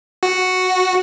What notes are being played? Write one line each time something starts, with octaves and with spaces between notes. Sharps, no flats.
F#4